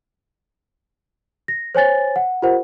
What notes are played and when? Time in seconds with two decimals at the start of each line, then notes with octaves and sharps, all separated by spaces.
1.48 A#6
1.75 C5 C#5 G#5 A6
2.16 F#5
2.42 F4 G4 A#4 C5 F#5